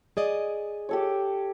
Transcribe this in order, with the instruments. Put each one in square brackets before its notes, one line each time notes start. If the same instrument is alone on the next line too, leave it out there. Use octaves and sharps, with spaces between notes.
[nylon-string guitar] G#4 D5 D#5
[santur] G4 A4 C#5